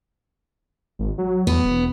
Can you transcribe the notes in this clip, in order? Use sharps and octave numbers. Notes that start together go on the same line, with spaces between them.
G#1
F#3
E2 B3
E1